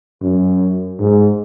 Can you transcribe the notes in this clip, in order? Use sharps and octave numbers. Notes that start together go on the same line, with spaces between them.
F#2
G#2